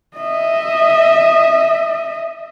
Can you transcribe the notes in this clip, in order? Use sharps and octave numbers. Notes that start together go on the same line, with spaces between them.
D#5 E5